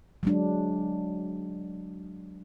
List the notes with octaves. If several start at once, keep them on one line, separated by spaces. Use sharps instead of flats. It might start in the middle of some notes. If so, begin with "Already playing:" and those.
F#3 G#3 D4